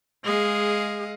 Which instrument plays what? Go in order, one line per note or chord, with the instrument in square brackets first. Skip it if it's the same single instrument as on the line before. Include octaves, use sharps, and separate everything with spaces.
[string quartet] G#3 G#4 D#5 F5